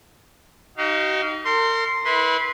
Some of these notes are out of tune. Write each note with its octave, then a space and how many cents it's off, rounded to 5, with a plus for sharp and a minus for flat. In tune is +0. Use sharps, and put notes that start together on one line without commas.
D#4 +0 F#4 +45 F5 -15
A#4 -40 C6 +0
E4 -30 B4 -15 C6 +0